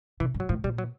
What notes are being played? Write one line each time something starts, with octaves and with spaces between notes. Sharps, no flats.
C3 E3
G2
F#3
A2 F3
A#2 G3
F#3